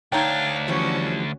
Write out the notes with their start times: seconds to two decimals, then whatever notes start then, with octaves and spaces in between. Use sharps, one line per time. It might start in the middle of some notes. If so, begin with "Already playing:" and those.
0.12 D2 D4 D#4 C#5 F5 G5
0.68 E3 F3 G3 C#4 F#4